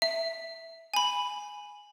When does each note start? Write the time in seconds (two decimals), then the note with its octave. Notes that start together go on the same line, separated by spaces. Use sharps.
0.02 E5
0.94 G#5 B5